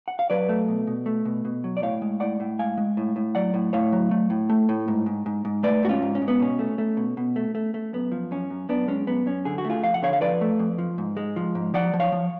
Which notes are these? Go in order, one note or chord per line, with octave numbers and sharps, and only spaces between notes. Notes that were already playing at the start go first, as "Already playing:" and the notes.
F#5
F5
F#3 B4 D5
A3
B2
B2
A3
B2
B2
F#3
D5
A2 C#5 F5
G#3
A2 D5 F#5
A2
G#3 F5 G#5
G#3
A2
A2
F#3 D5 F#5
A2
A2 C#5 F5
F#3
A3
A2
A3
A2
G#2
G#2
G#2
G#2
A3 B4 D5
G#2 F#4
C#4 F4
G#2
C#4
G#2
B3
B2 C#4
A3
A3
B2
B2
A3
A3
A3
F#2 B3
F3
F#2 C#4
F#2
F#2 B3 D4
G#3 C#4
F#2 B3
F#2 C#4
D3 G#4
F#4
A3
F4 G#4
F2 F5
F#5
D3 C#5 F5
F5
F3 B4 D5
A3
F2
F3
G#2
G#3
F3
G#2
F3 D5 F#5
F3
C#5 F5
F3